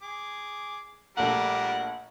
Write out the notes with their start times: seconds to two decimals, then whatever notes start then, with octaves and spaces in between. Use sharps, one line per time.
0.02 G#4 D6
1.17 A#1 G3 A3 D4 A#4 F#5 A#5